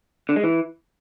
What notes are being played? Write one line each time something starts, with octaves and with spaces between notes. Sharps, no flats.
D3
G#3
E3